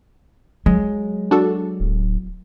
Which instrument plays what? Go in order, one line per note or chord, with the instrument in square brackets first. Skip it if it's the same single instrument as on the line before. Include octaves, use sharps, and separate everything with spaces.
[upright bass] F#3 [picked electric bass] G#3
[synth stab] D4 F#4 A4
[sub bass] D1